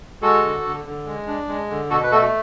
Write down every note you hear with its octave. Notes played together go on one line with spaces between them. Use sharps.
G#3 F#4 A4
D3
D3
D3
G#3
D4
G#3
D3
B2 F#4 A4
B4
A3 F#4 A4